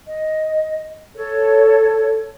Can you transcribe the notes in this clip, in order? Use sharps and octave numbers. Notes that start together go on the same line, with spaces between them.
D#5
A4 C#5